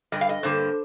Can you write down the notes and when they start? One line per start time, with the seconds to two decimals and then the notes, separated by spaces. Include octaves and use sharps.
0.12 G2 D3 G3 D#5
0.21 F5
0.29 D#5
0.43 G2 D3 G3 A#3 C5